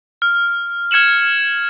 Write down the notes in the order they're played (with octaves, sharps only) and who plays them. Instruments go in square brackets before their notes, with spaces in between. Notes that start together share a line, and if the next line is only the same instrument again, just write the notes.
[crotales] F6
F6 G#6 C#7 E7 F#7